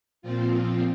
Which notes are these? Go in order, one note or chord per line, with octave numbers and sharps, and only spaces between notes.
A#2 F3 C4 F4